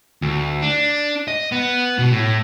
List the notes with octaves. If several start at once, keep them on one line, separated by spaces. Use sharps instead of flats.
D2
D4
D#5
B3
B2
A2